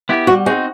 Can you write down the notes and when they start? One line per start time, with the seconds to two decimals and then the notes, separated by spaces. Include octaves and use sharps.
0.09 B3 E4 G4
0.27 G3 F#4
0.46 C4 D#4 F#4 G#4